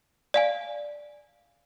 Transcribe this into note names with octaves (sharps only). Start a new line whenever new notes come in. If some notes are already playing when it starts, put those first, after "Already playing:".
D5 F5 G#5